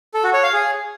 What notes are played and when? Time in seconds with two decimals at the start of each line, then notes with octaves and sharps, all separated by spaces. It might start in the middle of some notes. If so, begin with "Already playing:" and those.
0.14 A4
0.24 F#4
0.34 C#5
0.43 F5
0.53 G#4